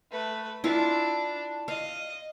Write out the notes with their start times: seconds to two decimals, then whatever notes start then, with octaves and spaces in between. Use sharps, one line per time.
0.11 A3 B4
0.64 D4 E4 F4
1.68 D#5 F5